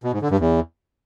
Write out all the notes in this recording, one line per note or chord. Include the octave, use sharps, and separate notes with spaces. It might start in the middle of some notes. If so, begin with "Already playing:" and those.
B2
G#2
D3
G2
E2